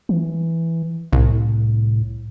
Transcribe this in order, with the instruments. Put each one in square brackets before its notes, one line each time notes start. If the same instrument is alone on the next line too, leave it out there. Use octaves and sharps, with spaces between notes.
[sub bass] E3
[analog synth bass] C2 [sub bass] A2